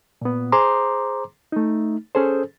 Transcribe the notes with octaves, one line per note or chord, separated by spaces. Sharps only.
A#2 B3
G#4 C5 A#5 C6 D6
A3 D#4
C#4 G#4 A4 C5